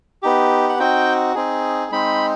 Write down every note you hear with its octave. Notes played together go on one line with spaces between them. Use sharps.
B3 D#4 G4
F#5
C4 D#4 F#4 G5
C4 D#4 G#4
G#3 C4 D#4 B5